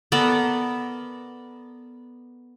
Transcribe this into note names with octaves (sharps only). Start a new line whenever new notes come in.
B3 A4 A#4 D5